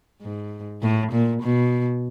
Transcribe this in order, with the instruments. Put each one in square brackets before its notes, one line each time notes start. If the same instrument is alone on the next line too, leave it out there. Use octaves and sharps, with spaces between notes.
[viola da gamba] G#2
A2
A#2
B2